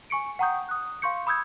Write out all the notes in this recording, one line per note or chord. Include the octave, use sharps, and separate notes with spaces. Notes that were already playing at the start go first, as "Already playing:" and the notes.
G#5 C#6 C#7 D7
F#5 G5 A#5 C#6 D#6 G6
D#6 F#6
F5 C6 C#6 G6 C#7
B5 D#6 E6 G6 G#6